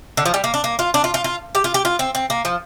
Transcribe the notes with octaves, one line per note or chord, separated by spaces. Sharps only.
D3
F3
G3
A#3
D4
A#3
F4
D4
F4
F4
F4
G4
F4
G4
F4
C4
C4
A#3
F3